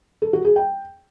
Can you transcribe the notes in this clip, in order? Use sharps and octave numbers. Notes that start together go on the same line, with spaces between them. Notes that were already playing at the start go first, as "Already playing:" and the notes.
A4
F#4
G#4
G5